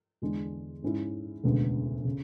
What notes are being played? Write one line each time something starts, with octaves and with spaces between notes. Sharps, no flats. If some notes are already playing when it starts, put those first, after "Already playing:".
E2 D3 G#3 D4
G#2 G#3 C#4 E4
E1 D2 C#3 G#3 B3
C#3